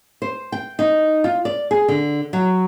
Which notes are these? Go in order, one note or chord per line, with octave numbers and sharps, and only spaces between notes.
C5
G5
D#4
F4
D5
G#4
D3
F#3